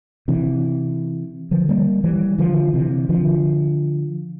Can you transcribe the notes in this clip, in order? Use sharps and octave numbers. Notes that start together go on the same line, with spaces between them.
C3 E3
D3 F3
G3 A#3
E3 G3
D3 F3
C3 E3
D3 F3